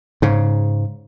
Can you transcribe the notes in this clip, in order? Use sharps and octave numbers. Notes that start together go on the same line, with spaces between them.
G#2 C#3